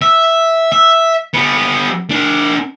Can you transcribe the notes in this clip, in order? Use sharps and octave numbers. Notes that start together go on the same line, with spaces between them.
E5
E5
G3 B3
D4 A#4